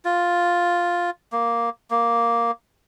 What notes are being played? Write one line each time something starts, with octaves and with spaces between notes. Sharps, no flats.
F4
A#3
A#3